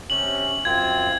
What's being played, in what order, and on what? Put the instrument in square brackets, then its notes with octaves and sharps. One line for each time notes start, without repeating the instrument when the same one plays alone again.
[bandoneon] C3 C#4 [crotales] F#7
[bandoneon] F#2 C4 F4 [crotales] G#6